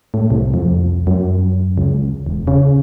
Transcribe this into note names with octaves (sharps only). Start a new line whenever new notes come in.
A2
C2
F2
F#2
C#2
E1
C#3